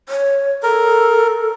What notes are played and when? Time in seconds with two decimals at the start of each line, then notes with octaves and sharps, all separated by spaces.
0.09 C#5
0.63 A4 A#4